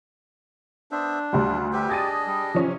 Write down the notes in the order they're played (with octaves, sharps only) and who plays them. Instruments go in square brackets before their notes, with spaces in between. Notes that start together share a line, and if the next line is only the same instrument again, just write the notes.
[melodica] B3 C5 E5 [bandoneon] D4
[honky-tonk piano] D2 G3 [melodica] F4
[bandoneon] G4 [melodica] B4 C5 E5
[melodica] D4 G#4 D#5 [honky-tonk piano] G#6 A6 D#7
[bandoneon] G3
[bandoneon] C3 [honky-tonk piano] F3 C#4